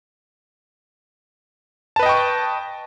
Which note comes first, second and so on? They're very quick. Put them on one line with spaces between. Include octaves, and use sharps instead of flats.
A5 B4 D#5 G5 C#6